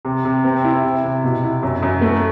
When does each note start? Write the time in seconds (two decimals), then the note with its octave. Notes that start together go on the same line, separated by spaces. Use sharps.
0.05 C3
0.25 C3
0.44 C4
0.65 E4
0.84 C3
1.04 C3
1.24 B2
1.43 E4
1.63 F#2
1.83 F#2
2.01 A3